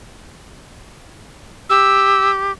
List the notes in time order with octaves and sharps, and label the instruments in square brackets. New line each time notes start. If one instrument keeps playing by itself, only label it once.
[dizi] G4 [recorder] E6